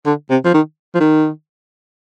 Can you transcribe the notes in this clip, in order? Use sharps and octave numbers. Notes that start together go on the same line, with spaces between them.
D3
C3
F3
D#3
F3
D#3